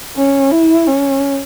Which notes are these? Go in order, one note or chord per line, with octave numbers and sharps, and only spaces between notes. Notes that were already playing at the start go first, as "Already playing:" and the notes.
C#4
E4
C#4